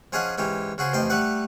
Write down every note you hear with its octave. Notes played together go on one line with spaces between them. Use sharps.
F3 C#4 G#4 D#5 F#5
G#2 E3 C#4 G4
C#3 F#4 G#4 C5
A1 F2 F3 D#5 G5 C6
G3 A3 B4 F#5